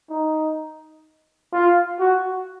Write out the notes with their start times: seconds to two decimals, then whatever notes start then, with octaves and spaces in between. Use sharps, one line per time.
0.10 D#4
1.53 F4
2.00 F#4